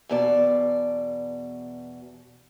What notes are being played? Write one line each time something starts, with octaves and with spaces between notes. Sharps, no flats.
E2 B2 D5